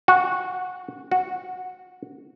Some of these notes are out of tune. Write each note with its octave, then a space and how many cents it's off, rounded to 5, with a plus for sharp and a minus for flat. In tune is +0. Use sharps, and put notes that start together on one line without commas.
F#4 -15
F#4 -10